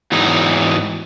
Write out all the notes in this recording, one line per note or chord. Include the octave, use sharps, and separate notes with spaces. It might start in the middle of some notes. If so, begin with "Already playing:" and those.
E2 G#2 E3 F#3 D#4